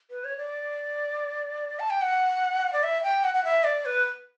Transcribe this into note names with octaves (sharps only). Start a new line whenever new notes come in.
B4
C#5
D5
A5
G5
F#5
D5
E5
G5
F#5
F#5
E5
D5
B4